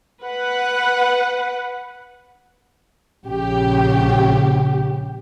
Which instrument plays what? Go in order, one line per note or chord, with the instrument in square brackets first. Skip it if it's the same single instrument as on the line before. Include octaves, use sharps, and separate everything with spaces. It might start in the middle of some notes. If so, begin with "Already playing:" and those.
[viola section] B4 F#5
[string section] A#1 C#3 G4